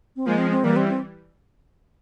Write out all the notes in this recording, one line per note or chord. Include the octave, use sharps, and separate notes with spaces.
C4
F3 G#3 A#3
C4
C4
E3 G3 A#3
C4
C4